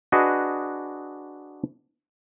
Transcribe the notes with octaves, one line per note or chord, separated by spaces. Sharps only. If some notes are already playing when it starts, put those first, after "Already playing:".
D4 F#4 G#4 B4 D#5